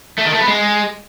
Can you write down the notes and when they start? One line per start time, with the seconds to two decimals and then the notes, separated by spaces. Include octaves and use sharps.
0.18 A3
0.25 D#3
0.33 A3
0.40 B3
0.48 G#3